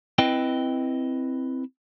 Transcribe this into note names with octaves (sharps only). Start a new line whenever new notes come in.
C4 E4 B4 D#5 G5